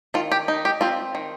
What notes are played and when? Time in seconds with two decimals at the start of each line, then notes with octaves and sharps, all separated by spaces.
0.14 D#3 F4
0.32 G4
0.48 D#4
0.65 G4
0.81 C4 F4
1.15 D#3